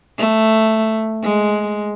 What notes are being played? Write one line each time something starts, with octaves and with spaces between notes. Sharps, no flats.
A3
G#3